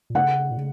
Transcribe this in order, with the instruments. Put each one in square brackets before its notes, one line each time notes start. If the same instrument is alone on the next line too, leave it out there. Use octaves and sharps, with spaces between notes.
[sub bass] A#2
[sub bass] C#3 [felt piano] F#5
[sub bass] A#2
C#3